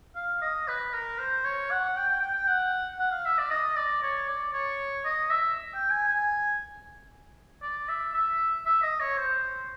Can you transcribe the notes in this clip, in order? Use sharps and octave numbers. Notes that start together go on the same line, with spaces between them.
F5
D#5
B4
A#4
C5
C#5
F#5
G5
G5
G5
G5
F#5
F#5
F5
E5
D5
D#5
D5
C#5
D5
C#5
D#5
E5
G5
G#5
G#5
D5
E5
E5
E5
D#5
C#5
C5